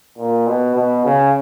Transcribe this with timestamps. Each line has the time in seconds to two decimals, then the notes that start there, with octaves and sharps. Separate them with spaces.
0.18 A#2
0.47 B2
0.76 B2
1.05 C#3